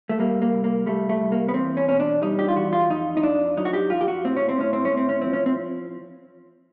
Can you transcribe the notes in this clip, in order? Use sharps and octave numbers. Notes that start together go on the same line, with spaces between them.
A3
G3 A#3
A#3
C2
A#3
G3 A3
A3
C2
A#3
B3
E2 C4
C#4
B2 C#4
D4
G3 D#4
G4
F4
E2 F#4
F4
F2 D#4
D#4
F2 D4
F#3 D#4
F#4
G4
F2 F4
G4
F#4
A2 C4
C#4
C4
A2 C#4
C4
C#4
A2
C4
C#4
F3 C4
C#4
C4